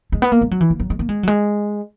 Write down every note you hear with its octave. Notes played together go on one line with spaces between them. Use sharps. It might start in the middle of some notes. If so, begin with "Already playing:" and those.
G#3
B3
A#3
G#3
F#3
E3
A#3
F#3
G#3
A#3
G#3
F#3
G#3